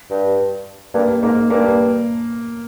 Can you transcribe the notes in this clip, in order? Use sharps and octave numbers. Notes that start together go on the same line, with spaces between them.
G2
G2 A#3
G#2 A#3
G2 A#3